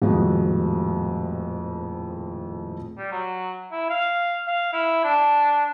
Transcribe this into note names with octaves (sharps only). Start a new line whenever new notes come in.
D#1 F2 A2 G#3 F#4
G3
F#3
E4
F5
F5
E4
D4